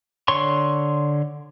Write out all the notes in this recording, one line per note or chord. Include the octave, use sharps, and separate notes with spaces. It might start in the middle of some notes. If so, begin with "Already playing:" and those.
D3 C#5 C6 C#6